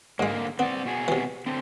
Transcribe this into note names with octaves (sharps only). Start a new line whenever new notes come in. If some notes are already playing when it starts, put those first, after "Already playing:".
G#2 D3 G#3 A#3
B3 C4 D5
B2 F#4 G#4
C3 E3
D3 C4